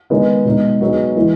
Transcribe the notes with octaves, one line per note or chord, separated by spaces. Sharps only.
D#3 G#3 B3 D#4
B2 G#3 D#4
F#3 B3 D#4 G#4
E3 G#3